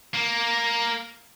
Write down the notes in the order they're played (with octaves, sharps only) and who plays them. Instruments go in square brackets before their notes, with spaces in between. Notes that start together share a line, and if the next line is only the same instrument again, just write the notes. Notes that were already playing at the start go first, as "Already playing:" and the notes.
[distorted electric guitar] A#3